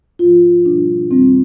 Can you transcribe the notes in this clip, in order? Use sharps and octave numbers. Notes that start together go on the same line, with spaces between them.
G#2 F3 F4
B2 G3 D4
F2 D#3 G3 C4